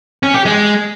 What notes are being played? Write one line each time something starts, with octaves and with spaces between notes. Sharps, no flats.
C#4
G4
G#3